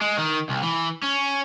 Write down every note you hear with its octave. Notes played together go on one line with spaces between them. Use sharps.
G#3
D#3
C2
E3
C#4